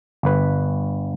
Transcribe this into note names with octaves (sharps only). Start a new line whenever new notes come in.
G1 B4